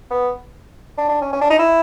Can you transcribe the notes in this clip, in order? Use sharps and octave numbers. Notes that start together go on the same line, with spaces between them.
B3
D4
D4
C#4
C#4
D4
D#4
E4